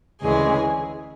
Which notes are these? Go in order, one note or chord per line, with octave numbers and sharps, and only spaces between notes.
D2 C#3 E3 G#3 G#4